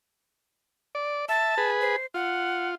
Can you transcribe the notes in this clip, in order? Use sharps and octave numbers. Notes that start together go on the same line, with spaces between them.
D5
E5 A5
G#4 B4
C5
F4 F#5